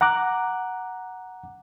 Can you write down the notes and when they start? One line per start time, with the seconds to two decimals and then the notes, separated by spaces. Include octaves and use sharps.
0.01 F#5 A#5 D6 F#6